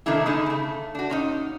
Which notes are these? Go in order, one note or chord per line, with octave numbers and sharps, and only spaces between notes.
C3 D#3 A3 A#3 D4 E4
B2 D3 A3 D#4 G#4
C#3 A3
D4 F#4
A#2 C#4 D#4